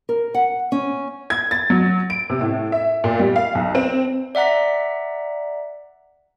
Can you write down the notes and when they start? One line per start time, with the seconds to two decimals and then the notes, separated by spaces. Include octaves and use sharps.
0.09 A#4
0.34 F#5
0.72 C#4
1.30 G#6
1.51 A6
1.70 F#3
2.10 D7
2.30 C3
2.41 A2
2.72 E5
3.04 A#2
3.20 G3
3.36 F5
3.55 B1
3.75 C4
4.35 D5 E5 F#5 A#5 B6